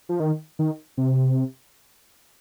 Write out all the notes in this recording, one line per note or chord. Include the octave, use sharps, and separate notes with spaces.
F3
D#3
D#3
C3